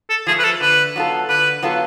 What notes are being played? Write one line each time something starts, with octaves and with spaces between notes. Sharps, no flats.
A4
F3 A3 G#4
B4
A4
D3 B4
F#3 B3 F4 A4
D3 B4
F#3 B3 F4 A4